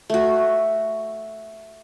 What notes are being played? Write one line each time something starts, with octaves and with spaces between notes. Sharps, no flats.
A3 F#4